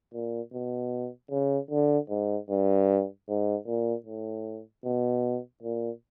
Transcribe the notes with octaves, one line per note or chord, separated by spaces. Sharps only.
A#2
B2
C#3
D3
G#2
G2
G#2
A#2
A2
B2
A#2